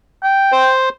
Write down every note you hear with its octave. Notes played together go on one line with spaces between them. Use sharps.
G5
C5